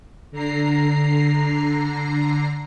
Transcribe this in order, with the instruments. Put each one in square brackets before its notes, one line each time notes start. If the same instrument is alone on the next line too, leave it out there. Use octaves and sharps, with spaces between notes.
[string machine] D3 A#5 C7